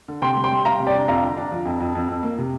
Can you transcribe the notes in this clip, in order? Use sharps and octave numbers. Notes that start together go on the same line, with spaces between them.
D3
C3 G5 C6
G3
G5 C6
G3
G3 F5 A#5
C3
D5 G5
D4
F2 F5 A#5
D3
D4
F3
F2
F2
F2
F2
A#3
C3